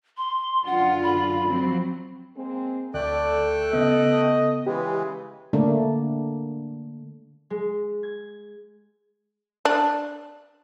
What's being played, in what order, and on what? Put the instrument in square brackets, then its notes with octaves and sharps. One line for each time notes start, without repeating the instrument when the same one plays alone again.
[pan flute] C6
[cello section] F#2 D3 F4 [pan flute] F#5
[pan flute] B5
[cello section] F3 F#3 C4
[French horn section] G#3 A#3 C4
[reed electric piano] D2 [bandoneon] A3 G5 F#6 [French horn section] A4 [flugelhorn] D5
[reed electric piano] C#3 B3 [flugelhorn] D#5
[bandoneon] C#3 E3 G#3 [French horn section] E4 B4 [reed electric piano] G4
[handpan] D3 A3 A#3 D4
[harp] G#3
G#6
[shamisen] D4